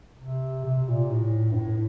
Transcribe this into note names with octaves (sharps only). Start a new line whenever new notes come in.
C3
C3
A#2
A2
G2
A2